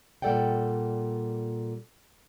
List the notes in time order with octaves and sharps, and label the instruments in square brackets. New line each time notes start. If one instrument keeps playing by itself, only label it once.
[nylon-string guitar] A#2 G3 A4 D5 F#5 G5